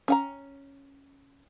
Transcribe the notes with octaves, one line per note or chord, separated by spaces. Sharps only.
C#4 F#5 A#5